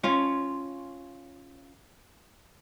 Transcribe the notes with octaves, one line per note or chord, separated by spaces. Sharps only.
C#4 F4